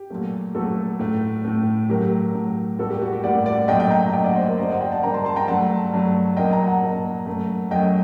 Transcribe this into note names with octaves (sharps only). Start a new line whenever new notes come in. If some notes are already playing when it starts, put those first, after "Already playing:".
Already playing: G4
A#2 F#3 A3
A#2 F#3 A3 F#4 A4
A2 A3
A2 A3
A2 F#3 A3 G4 A#4
A2 F#3 A3
A2 G3 A#3 F#4 A4
G4
F#4
G4
A2 G3 A#3 D5 F#5
D5 F#5
A#2 F#3 A3 D#5 G5
D#5 G5
G5 A#5
A#2 F#3 A3 D#5 G5
D5 F#5
C5 D#5
A#4 D5
G2 D3 G3 A#3 C5 D#5
D5 F#5
D#5 G5
F#5 A5
G2 D3 G3 A#3 G5 A#5
A5 C6
A5 C6
G5 A#5
G2 F#3 A3 F#5 A5
G2 F#3 A3
A#2 F#3 A#3 D#5 G5
G5 A#5
F#5 A5
A#2 F#3 A#3
F#2 F#3 A3
F#2 F#3 A3 D#5 G5